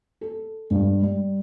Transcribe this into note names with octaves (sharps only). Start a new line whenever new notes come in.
A4
G2
G3